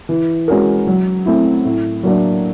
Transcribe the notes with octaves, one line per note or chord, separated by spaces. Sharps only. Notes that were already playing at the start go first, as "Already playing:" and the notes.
E3
G#3 C#4 F#4 A#4
F#3
A3 C4 E4
A2
F#3 A#3 D4